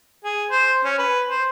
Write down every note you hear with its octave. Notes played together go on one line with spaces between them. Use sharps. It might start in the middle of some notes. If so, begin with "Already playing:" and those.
G#4
C5
C#4
B4
C5